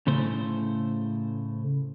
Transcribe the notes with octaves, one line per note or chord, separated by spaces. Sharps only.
A2 C#3 A3 C5